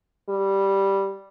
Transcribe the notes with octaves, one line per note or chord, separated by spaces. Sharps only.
G3